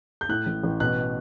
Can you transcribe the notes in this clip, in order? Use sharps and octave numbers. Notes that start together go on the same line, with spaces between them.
G6
A2 F#6
A1
A1
B2 F#6